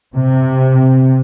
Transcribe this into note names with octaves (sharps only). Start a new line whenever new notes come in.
C3